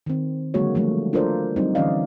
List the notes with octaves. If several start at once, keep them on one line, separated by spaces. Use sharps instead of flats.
D#3 C4
D3 F#3 G#3 A#3 F#4 C#5
D#3 F3 G3 A3
D4 F4 A4 A#4 C5 D5
F#3 G3 C4 D#4
D3 E3 C#4 D5 D#5 F5